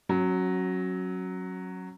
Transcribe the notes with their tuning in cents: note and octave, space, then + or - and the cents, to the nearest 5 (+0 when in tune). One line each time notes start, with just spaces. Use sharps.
F#3 +0 C#4 -25